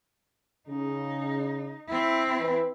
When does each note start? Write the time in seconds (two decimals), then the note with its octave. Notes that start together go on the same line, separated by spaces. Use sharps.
0.69 C#3 D#4
1.88 C4 E4
2.38 E3 B4